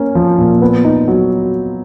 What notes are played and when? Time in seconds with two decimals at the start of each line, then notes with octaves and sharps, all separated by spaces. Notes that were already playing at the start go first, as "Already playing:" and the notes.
Already playing: A#3 C#4
0.15 F3
0.38 A#2
0.62 B3
0.85 D#4
1.08 F#3